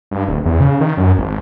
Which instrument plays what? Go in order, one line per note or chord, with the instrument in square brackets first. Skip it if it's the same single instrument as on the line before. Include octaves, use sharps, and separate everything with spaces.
[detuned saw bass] G2
D1
E2
C#3
D#3
F#2
G#1